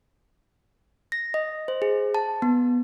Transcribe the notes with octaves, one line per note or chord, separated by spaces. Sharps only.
A#6
D#5
C5
G#4
A5
B3